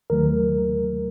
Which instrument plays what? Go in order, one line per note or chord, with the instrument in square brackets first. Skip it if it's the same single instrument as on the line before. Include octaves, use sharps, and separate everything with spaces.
[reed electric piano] D#2 D#3 F#3 A3 A#4